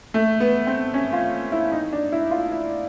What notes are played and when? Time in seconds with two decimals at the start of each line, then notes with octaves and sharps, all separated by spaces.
0.14 A3
0.40 B3
0.67 C4
0.94 C#4
1.13 F4
1.52 E4
1.72 D#4
1.93 D4
2.12 E4
2.31 F4
2.52 E4